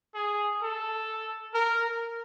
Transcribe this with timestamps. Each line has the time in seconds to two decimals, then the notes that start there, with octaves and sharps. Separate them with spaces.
0.14 G#4
0.62 A4
1.54 A#4